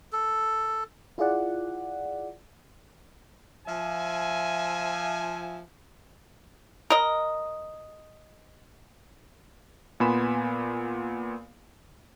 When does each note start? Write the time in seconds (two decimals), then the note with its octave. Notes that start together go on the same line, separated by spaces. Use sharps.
0.13 A4
1.18 E4 F4 G#4 D5 F#5
3.67 F3 E5 G#5
6.90 A#4 D#5
10.00 A#2 B3 G#5 B5 C6 E7